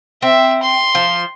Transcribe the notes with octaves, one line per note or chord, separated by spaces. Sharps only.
C4 E5
C6
F3